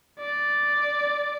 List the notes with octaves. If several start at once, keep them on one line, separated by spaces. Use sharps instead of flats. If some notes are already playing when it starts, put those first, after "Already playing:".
D5